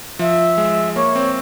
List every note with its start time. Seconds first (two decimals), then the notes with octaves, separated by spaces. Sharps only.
0.19 F3 E5
0.57 G#3
0.96 A#3 C#5
1.15 C4